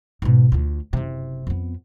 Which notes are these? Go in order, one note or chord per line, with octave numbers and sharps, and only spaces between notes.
G#2 B2
D2 F4
F#1 C3
F2 B3